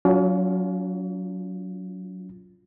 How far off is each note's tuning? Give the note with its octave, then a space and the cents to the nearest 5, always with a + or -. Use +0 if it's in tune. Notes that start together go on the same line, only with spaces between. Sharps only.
F#3 +0 C#4 +40 F4 +0